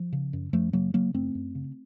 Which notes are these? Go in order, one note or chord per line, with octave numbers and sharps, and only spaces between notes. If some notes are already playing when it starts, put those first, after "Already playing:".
Already playing: F3
C#3
F#2
F#2 F3 A3
C#3 F#3 A#3
C#3 F#3 A#3
F#2 A3 C4
F#2
C#3